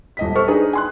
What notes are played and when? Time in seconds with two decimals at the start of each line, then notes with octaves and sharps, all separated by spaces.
0.17 D#1 D#5 B6
0.35 A4 C5 C#6 F6
0.48 D4 D#4 G#4 B4
0.73 G#5 C6 F#6